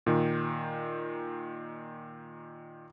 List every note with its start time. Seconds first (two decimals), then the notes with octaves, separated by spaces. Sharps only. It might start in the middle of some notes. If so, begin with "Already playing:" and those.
0.06 A#2 D#3